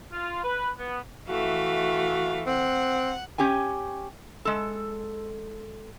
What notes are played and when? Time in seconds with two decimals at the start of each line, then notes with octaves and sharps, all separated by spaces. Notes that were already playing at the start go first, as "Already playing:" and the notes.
0.11 F4
0.43 B4
0.77 B3
1.29 E3 A3 F#4 F5
2.47 C4 F#5
3.38 C#4 G4 G5 G#5
4.45 G#3 A4